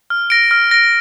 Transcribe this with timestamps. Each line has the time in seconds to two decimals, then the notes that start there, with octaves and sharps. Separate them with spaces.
0.10 F6
0.30 A#6 D7
0.51 F6
0.71 A#6 D7